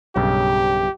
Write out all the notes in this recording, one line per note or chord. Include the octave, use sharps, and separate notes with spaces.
B1 G2 C#3 G4